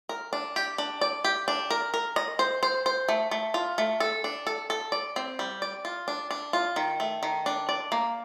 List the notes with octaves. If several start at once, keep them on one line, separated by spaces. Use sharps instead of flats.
A#4
D4
G4
D4
D5
G4
D4
A#4
A#4
D#5
C5
C5
C5
A3
A3
F4
A3
A4
D4
A4
A4
D5
C4
G3
D5
F4
D4
D4
F4
D#3
A3
D#3
D4
D5
A#3